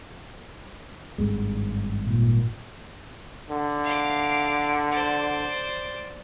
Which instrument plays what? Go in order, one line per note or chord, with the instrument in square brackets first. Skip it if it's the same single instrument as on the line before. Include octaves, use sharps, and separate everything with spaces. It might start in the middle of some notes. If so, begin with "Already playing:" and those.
[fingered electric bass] G#1 G2 G#3
[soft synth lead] A#2
[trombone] D3
[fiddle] F5 D6
C5 D5